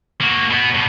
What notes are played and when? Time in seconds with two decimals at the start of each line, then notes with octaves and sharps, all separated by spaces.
0.21 A#3 F#4
0.50 B2 B3
0.75 G2 B2